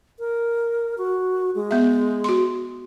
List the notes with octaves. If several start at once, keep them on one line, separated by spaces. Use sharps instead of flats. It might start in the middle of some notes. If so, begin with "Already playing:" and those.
A#4
F#4
G#3
B3 E5
F#4 C6